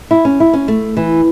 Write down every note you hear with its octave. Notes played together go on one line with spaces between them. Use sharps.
E4
C#4
E4
C#4
A3
E3